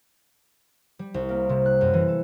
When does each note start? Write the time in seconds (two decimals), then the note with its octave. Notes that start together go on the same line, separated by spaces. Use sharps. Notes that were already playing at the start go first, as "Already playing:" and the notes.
0.99 G3
1.14 C2
1.29 A#3
1.49 C3
1.66 F#6
1.81 F#2
1.94 E3
2.08 A4